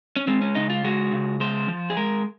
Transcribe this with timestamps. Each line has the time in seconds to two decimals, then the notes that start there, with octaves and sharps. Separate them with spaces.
0.16 C#4
0.27 G#3 C4
0.41 C#4
0.55 C#3 D#4
0.70 F4
0.84 G#3 F#4
1.13 C#3
1.40 G#3 C5
1.68 F3
1.90 G#4
1.97 G#3 A#4